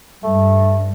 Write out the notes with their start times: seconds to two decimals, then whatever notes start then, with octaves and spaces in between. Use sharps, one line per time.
0.24 G2 A3